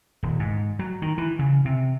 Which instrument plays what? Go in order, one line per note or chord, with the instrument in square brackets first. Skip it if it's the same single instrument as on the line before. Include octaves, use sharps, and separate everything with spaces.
[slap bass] D#1
G#2
F#3
D#3
E3
C#3
C3